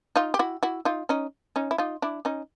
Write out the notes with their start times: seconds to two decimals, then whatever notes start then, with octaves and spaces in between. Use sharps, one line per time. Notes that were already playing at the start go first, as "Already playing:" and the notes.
0.16 D#4 F4
0.34 G4
0.39 E4 F#4
0.63 E4 F#4
0.85 D#4 F4
1.09 C#4 D#4
1.56 C#4 D#4
1.71 E4
1.78 D#4 F4
2.02 D4 E4
2.25 C#4 D#4